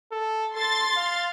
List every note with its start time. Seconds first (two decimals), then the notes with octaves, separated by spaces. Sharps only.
0.12 A4
0.56 A4 C6 A6
0.97 F5